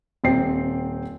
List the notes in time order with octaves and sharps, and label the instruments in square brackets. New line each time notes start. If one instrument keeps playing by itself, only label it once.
[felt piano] D#1 C4 G5 C7